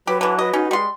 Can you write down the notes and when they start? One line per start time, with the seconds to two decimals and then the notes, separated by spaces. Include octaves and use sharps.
0.07 F#3 G4 B4
0.21 D3 E3 B4
0.39 F#4 B4 D#5
0.53 C#4 D#4
0.71 G3 G#3 C6